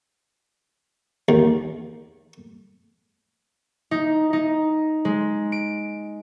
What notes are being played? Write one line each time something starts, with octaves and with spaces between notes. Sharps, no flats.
D#2
D#4
D#4
G#3
D7